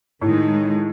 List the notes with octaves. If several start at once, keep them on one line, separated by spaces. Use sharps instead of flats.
A2 D#3 G#3 D#4